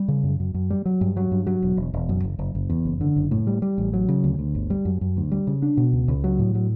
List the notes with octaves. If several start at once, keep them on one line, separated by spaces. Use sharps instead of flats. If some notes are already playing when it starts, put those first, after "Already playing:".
Already playing: G3
C#3
F#2
F#2
F#2
G3
F#3
G2
F#3
G2
F#3
E1
E1
E1
F#2
F#1
F#1
F#1
E2
F#1
D3
F#1
A2
G3
G3
A1
F#3
C#3
D2
D2
G1
G3
F#2
F#2
D2
G3
C#3
D4
B2
C#2
C#2
F#3
A2
F#3